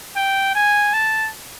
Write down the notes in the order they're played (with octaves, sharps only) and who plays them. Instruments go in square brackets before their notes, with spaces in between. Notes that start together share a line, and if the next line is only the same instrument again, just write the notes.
[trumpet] G5
G#5
A5